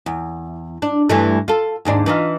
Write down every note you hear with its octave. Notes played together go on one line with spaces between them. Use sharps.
E2
D4
G2 E3 A3
F4 A4
D#2 G#2 D4
E3 D#4 F4